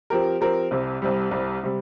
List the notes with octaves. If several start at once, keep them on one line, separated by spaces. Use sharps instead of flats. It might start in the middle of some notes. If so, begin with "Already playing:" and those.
F3 C4 G4 A#4
F3 C4 G4 A#4
C2 C3 G3
C2 C3 G3
C2 C3 G3
C3 G3